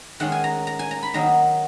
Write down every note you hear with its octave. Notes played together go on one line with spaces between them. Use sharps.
D#3 G#3 C#4 F4 F#5
G#5
A#5
A#5
G#5
A#5
B5
D#3 F#3 A#3 D#4 A#5